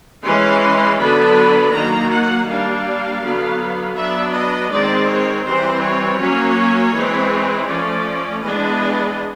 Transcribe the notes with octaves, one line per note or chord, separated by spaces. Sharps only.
E3 G#3 C#4 C6
D3 F#3 B3 D4 B5
D#3 F#3 A#3 A#5
F#5
G3 A#3 D4 F5
D3 F#3 B3
F#3 B3 D4 E5
D#5
D#3 G#3 C4 D5
C#5
E3 G3 C4 C5
C#5
F#3 A#3 C#4
E3 G#3 C4
F3 A3 C#4 D5
E3 G#3 B3 D4 D#5